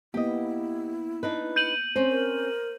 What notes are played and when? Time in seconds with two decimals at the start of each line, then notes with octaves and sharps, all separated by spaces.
0.14 A#3 B3 E4 G4 D#5
1.23 D4 D#4 B4
1.56 G6 D#7 F#7
1.96 C4 C#4 C5
2.10 A#4